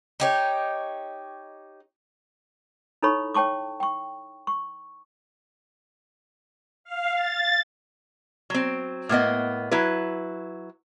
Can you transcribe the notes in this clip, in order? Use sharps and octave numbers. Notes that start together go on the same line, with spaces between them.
D#4 G4 C#5
D#4 E4 A4 C#5 B5 C#6
C#5 G5 A5 C#6 D6
G5 C#6
C#6
F5
A6
F#3 C4
A2 A#3 B3 D#5
F#3 E4 B4